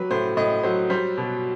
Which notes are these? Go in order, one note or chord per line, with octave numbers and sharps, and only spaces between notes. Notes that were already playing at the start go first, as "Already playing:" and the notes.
Already playing: F#3 G3 B4
A2 C5
A2 D#5
F#3 C5
G3 C5
B2